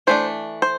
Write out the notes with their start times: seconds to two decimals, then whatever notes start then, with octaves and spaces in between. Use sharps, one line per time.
0.07 E3 A3 D4 C5
0.62 C5